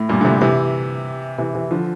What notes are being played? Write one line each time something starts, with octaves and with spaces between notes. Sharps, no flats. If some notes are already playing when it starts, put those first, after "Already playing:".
Already playing: A2
G2 A#2
D3
A2 C3
C3 E3
C3 E3
C3 E3
D3 F3